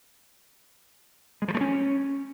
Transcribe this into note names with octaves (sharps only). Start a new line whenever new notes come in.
G#3
F3
A3
C#4